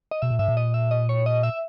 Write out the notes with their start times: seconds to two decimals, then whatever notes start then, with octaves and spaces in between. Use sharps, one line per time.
0.11 D#5
0.22 B2 E5
0.30 A#2
0.39 G#2 E5
0.48 A#2
0.57 D#5
0.74 E5
0.91 D#5
1.09 C#5
1.26 D#5
1.43 E5